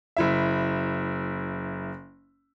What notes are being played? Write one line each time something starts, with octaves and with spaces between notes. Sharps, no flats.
F#1 E4 E5